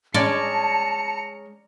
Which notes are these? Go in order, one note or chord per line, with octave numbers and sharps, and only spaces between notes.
G#3 C#4 D5 A5 A#5 C#7